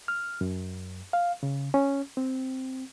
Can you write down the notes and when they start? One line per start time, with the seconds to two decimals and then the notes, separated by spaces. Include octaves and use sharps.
0.08 F6
0.41 F#2
1.13 F5
1.43 C#3
1.74 C#4
2.17 C4